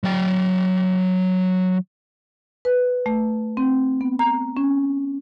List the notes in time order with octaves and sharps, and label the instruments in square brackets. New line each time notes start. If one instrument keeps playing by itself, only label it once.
[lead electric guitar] F#3 G5
[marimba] B4
A3
C4
B3
A#5
C#4